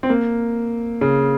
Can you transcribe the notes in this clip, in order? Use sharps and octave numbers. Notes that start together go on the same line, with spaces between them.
C4
A#3
C#3